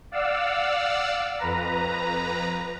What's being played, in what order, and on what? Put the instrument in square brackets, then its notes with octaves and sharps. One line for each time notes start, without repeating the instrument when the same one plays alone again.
[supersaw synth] D5 F5 F#5 E6
F2 B4 A#5